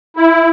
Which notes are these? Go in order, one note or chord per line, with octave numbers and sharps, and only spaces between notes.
E4